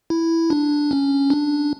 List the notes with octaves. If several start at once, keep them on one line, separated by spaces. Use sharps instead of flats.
E4
D4
C#4
D4